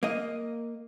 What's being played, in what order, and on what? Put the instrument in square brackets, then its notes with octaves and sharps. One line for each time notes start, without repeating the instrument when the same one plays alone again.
[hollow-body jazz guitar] A#3 D#5